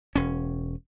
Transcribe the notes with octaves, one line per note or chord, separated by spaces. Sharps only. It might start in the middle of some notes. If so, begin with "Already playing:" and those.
E1 C#4